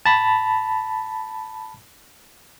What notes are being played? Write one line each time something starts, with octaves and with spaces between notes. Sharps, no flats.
A5 B5